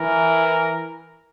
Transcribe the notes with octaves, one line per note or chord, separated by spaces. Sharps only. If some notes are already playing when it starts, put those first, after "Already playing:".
Already playing: E3 A#4